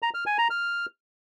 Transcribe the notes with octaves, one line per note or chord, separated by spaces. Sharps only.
A#5
F6
G#5
A#5
F6